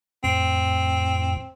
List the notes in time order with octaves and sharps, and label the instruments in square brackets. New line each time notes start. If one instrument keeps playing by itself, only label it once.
[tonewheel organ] F2 A2 [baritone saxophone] C4